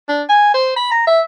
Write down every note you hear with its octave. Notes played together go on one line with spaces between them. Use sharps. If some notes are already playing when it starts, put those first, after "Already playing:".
D4
G#5
C5
B5
A#5
E5